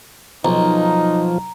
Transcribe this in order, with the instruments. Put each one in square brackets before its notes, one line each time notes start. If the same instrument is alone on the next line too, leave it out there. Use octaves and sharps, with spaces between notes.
[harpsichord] B1 [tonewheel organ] F3 [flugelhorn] D#4 [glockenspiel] A#5